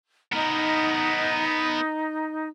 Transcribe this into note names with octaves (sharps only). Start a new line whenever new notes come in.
B3 D#4 A#4